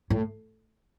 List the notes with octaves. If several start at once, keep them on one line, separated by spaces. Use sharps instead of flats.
A2